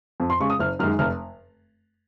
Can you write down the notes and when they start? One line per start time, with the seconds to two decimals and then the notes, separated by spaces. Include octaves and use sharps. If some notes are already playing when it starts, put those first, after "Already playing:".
0.20 F2
0.30 C6
0.40 C#3 G#3 C#6
0.50 D#6
0.59 F#1 F6
0.79 F#2 D#3 G#3 F6
0.99 F1 F6